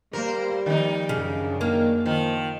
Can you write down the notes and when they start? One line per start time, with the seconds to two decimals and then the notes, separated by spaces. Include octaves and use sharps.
0.13 G3 A#3 A#4 C5
0.66 D#3 F3 A#3 D#4
1.09 F#2 C#3 D4
1.61 D#3 A#3
2.06 D#3 F3